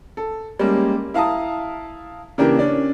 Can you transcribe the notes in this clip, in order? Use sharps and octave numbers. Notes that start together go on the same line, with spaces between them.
A4
G3 G#3 A#3 C#4
E4 F5 A5 A#5 D#6
C#3 E3 A#3 D4 G4 A#4
C#4 D4 D5